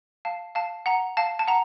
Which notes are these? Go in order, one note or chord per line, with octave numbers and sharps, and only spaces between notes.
F5 A5
F5 A5
F#5 A#5
F5 A5
A5
F#5 A#5